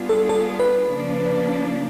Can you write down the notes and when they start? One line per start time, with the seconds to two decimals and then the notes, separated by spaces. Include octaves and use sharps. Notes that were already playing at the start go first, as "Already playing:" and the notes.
Already playing: G3 B3 D4 F4 G#4
0.09 A4
0.29 A4
0.60 B4
0.91 C#3 F3 A#3 D4